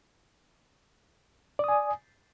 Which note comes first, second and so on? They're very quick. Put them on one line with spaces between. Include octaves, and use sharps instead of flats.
D5 D#6 G#5